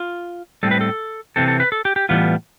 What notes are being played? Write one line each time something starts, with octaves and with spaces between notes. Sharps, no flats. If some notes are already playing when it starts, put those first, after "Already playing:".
Already playing: F4
A2 G3 C4 A4
B4
A4
C3 E3 C4 A4
A4
B4
A4
G4
G4
A2 E3 G3 B3 F4